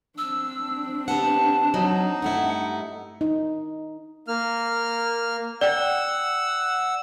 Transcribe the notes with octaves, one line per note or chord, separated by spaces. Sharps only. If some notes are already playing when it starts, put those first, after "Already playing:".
C4 D4 E6
B3 G4 F#5 A5
F#3 D#4
G2 A3 E4 F#5
D#4
A#3 F6
D5 F#5 G5 E6